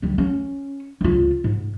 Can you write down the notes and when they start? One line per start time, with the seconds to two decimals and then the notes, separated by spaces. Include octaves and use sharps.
0.02 D2 G3
0.18 C#4
1.01 C#2 F4
1.44 G#2